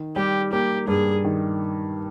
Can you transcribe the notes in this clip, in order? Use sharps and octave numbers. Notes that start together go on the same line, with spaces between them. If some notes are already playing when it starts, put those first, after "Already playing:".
Already playing: D#3
G3 G4
A#3 G4
G2 G#4
D#3